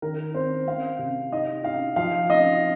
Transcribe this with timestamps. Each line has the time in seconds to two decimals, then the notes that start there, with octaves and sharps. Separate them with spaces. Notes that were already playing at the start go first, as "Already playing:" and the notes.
0.02 D#3 A#4
0.34 C4 C5
0.67 C4 F5
0.99 C3
1.32 D#4 D#5
1.64 D#4 F5
1.96 F3 F5
2.29 D#4 D#5